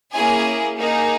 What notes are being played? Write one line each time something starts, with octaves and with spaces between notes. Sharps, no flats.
A#3 C#4 E4 G#4 G#5
A#3 D#4 G#4